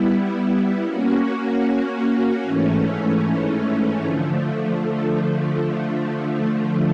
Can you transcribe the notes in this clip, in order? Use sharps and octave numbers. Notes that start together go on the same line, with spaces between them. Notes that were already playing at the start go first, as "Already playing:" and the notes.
Already playing: G3 B3 E4
A#3 C#4 F#4
G#2 E3 A3 C#4
D3 F3 A3